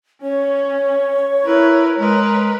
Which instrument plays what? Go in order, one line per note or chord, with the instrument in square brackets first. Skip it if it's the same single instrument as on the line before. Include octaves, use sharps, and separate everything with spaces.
[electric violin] C#4 [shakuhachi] C#5
[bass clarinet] E4 [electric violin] A#4 B4
[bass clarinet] G#3 [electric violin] A#4 B4